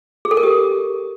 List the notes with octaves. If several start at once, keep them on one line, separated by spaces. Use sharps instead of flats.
G#4
A4
A#4
G4